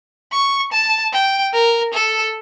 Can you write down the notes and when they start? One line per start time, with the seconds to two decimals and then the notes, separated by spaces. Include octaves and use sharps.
0.33 C#6
0.72 A5
1.13 G5
1.54 A#4
1.94 A4